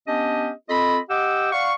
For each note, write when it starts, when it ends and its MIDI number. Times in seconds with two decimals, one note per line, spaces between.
0.07 0.49 59
0.07 0.49 61
0.07 0.49 62
0.07 0.49 67
0.07 0.49 75
0.68 0.98 60
0.68 0.98 65
0.68 0.98 69
0.68 0.98 75
0.68 0.98 83
1.09 1.50 67
1.09 1.50 75
1.09 1.50 78
1.09 1.50 79
1.09 1.50 86
1.09 1.50 88
1.52 1.72 74
1.52 1.72 77
1.52 1.72 78
1.52 1.72 85